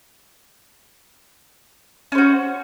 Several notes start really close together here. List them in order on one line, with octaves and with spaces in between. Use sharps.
C#4 C5 F#4